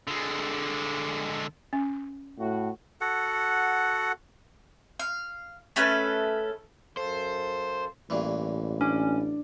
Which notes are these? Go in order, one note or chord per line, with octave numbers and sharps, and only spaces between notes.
D3 G#3
C#4
A2 F#4
F#4 A4 F#5
F5
A3 C#4 A4 B4
F#2 A4 C5 F5
A1 G2 A#2 E3
C#4 D4 D5